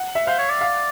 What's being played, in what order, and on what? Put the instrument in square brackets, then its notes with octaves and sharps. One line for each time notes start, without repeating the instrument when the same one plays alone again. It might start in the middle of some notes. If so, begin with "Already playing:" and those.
Already playing: [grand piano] F#5
E5
[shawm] C5 [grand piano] F5
[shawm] C#5
D5
[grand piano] F5